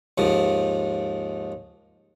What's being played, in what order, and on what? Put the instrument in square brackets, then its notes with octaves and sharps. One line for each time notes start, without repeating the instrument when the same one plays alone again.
[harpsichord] D#2 G#2 F3